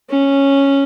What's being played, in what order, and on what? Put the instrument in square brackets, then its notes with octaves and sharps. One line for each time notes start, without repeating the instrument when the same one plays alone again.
[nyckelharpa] C#4